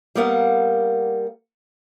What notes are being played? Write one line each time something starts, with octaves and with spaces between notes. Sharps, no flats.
G3 A#3 B3 A#4 F5 F#5